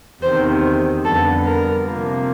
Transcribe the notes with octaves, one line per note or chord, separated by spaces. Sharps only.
E2 C3 D#3 C5
F2 D3 G3 B3 A4
A#4
C3 F3 A#3